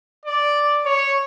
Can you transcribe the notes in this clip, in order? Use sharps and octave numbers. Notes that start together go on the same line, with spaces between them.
D5
C#5